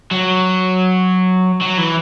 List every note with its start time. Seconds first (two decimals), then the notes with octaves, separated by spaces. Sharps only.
0.11 F#3
1.61 F#3
1.78 E3